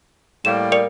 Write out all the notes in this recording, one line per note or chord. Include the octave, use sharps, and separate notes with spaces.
A2 G3 A#3 E7
A#4 D5 C#7